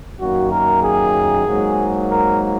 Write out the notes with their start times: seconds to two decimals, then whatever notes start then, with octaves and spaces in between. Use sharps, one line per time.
0.19 F#2 D#3 A#3 F#4
0.51 A#4
0.82 G#4
1.46 G#2 F#3 A#3
2.10 A#4